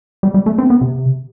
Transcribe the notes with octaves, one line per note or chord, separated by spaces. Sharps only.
G3
G3
A3
C4
B3
C3